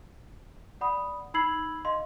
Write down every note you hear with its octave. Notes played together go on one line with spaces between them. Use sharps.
D5 F#5 B5 D#6
D#4 B5 E6 G#6 C7 F#7
D#5 F5 C6